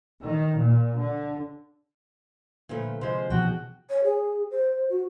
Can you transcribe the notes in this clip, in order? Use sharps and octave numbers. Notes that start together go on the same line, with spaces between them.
D#3
A#2
D3
A#2 D3 F3 G3 A3 B4
C3 F3 G#3 F4 C5
B2 E3 F3 F#4 G#4 G5
C#5
G#4
C5
F#4